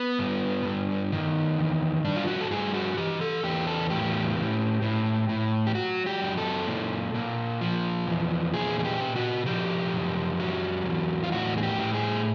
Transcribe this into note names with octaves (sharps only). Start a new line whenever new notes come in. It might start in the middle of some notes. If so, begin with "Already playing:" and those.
Already playing: B3
G2
G2
D#3
E2
G2 D4
F4
F#4
A4
G2 G#4
F#4
E3 G4
A4
E2 G4
A4
A2 G4
A2
A2
A2
G4
F#3 F#4
G4
F#2
A4
A#2
A#2
F3
E2
A#2 G#4
G#4
G4
A#2
F#4
F3 G4
F#2
F#3
E2
F4
A2 F#4
G#4
G4
A2
G#4